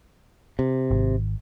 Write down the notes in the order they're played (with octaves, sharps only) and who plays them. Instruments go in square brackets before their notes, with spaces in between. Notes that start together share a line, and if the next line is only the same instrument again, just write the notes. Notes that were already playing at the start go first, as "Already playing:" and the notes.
[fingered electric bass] C3
[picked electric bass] G#1